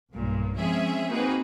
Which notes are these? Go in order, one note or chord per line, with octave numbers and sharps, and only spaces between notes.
B1 G2 A#2
F3 G#3 C4 C#4 G#4 E5
A#3 C4 D#4 F#4 G#4 B4